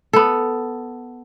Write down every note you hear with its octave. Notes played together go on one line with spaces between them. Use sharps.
B3 A4